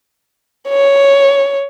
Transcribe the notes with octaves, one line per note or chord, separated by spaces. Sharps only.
C#5